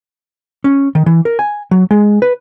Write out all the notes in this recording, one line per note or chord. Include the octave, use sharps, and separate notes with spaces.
C#4
D#3
E3
A#4
G#5
F#3
G#3
B4